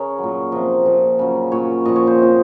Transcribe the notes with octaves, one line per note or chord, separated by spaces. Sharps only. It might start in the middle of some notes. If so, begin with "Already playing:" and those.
Already playing: C#3 G#4 A#4 C#5
A#2 F#3
C3 F3 D#5
A#2 F3
C#3 F#3
A#2 F#3 C#5
A#2 F3 D#5
C#5
C5
C3 F3